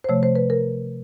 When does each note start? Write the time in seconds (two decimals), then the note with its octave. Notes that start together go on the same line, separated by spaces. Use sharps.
0.04 C5
0.09 C3 F3 A3 C#5
0.23 C5
0.35 B4
0.50 A#4